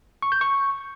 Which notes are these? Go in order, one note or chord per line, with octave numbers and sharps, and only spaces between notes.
C#6
G6
C#6